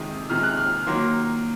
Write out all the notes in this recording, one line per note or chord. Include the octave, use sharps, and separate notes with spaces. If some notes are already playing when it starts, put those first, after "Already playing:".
Already playing: C3 D#3 G#3 D#6
C3 D#3 G#3 F6
F#6
F6
D#3 F#3 A#3 C6